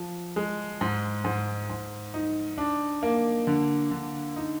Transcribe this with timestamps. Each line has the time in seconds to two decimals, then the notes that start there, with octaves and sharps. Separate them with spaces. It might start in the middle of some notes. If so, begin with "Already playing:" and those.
Already playing: F3
0.36 G#3
0.81 G#2
1.25 G#2
1.69 G#2
2.14 D#4
2.58 D4
3.03 A#3
3.47 D3
3.91 D3
4.36 D#4